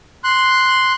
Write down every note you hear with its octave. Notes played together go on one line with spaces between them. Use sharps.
C6 F#6